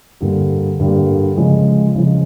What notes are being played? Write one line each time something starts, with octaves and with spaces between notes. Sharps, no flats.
G2 D3 G3 A#3
G2 D3 G3 A#3
C#3 F3 G#3
C#3 F3 G#3